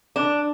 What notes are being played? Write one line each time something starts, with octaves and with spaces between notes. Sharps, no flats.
D4